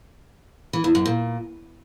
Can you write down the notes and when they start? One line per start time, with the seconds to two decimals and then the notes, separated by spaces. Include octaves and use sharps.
0.73 E3
0.84 E2
0.95 F#2
1.06 A#2